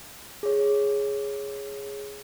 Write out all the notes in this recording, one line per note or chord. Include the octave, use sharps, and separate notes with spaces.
G#4 C#5